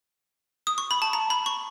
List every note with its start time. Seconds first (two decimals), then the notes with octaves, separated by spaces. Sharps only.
0.67 D#6
0.78 C#6
0.91 B5
1.02 A5
1.13 A#5
1.30 B5
1.46 C#6